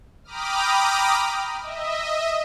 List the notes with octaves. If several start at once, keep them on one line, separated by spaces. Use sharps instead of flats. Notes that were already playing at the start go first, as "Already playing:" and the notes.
G5 A#5 B5 D6 D#6 F6
D#5 E5